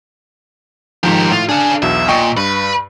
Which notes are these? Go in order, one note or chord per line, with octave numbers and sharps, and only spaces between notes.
G#2 D#3 F3 G4 A#4
A2 F4
D4 G#4 F5
B1 E2 B2 E5
A#2 D#5 G5 C#6
G2 B4